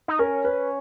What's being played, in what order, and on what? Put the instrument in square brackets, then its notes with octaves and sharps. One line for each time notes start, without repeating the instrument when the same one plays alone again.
[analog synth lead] D#4
[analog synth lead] C#4 [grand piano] A#4
[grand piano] B4